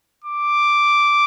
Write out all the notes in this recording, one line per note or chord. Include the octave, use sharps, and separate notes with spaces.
D6